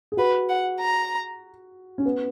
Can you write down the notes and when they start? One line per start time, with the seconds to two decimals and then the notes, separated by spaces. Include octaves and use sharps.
0.12 G#4
0.17 F#4 B4
0.49 F#5
0.80 A#5
1.98 C#4
2.05 B3